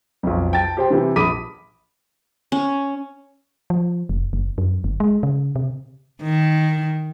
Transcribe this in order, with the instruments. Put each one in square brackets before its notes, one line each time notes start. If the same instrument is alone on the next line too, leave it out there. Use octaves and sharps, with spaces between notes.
[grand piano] B1 F2
G5 A5 A6
G4 C5 G5
C3 E3 G4
A#1 B5 D6 D#6 B6 D#7
[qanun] C#4
[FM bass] F3
F1
F#1
F#2
G1
G#3
C#3
C3
[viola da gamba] D#3